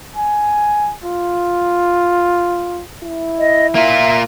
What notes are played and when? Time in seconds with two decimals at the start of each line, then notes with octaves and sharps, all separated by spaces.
0.16 G#5
1.04 F4
3.04 E4
3.39 D#5
3.75 A#3 F4 E5